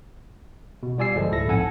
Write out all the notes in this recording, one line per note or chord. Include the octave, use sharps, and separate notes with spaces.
B2
G3 F4 D5 G#5 E6 C7
G1 F3 G#3 A4
D2 A2 E4 A4 A#6
A#1 F2 G#2 A4 F#5 G#5